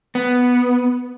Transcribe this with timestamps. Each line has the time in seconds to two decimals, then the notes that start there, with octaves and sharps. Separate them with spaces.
0.15 B3